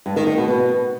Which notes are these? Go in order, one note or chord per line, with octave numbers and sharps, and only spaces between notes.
G2
D#3
D#3
B2
B2